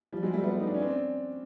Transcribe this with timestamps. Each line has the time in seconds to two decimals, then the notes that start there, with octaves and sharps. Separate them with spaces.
0.12 F3 G3
0.23 F#3 G#3
0.33 G3 A3
0.44 A3 B3
0.60 D#4
0.67 D4
0.74 C#4
0.82 C4 D4